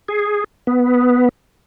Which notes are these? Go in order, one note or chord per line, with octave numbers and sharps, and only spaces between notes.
G#4
B3